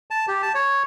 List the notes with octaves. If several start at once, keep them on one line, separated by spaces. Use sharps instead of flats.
A5
G4
A5
C#5